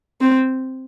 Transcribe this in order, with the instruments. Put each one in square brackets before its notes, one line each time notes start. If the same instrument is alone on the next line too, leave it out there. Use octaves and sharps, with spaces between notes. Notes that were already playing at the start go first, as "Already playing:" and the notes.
[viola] C4